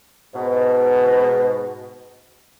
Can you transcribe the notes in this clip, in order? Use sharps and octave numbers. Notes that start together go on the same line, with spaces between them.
G#2 B2